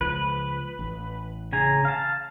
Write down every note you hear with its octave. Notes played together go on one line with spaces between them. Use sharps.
C#2 F3 B4
A1
C#3 G#5 A#5
F5 A5